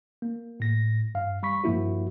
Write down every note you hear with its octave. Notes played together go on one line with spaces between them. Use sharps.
A#3
A2 A#6
G2 F5
G3 B5 C#6 B6
G2 F3 A#3 E4 F#4